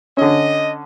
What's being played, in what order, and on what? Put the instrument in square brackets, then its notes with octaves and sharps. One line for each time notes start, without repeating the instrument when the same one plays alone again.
[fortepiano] D3 C#4 [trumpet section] D#5